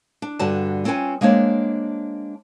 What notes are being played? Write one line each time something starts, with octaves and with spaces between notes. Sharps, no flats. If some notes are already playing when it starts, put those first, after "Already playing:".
D4
G2 D3 F#4 D5 A5
C4 C#4 F4 B4 G#5
G#3 A#3 C4 D4 C#5